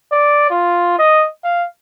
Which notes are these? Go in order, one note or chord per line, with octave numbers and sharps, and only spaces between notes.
D5
F4
D#5
F5